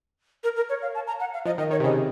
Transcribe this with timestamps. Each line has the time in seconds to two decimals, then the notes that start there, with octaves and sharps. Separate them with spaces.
0.44 A#4
0.56 A#4
0.70 C#5
0.82 F5
0.95 A5
1.07 A#5
1.20 F#5
1.34 F5
1.46 F3 D#5
1.58 D#3 D#5
1.71 D#3 C#5
1.80 C3
1.84 C#3 D#5